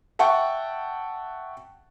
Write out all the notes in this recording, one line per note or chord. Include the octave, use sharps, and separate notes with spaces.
E5 F#5 G5 A5 C#6